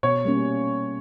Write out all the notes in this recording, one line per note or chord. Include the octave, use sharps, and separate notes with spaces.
B2 C#5
G3 A#3 C#4